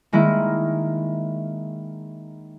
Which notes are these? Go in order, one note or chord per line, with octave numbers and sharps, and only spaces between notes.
D#3 G#3 A#3 E4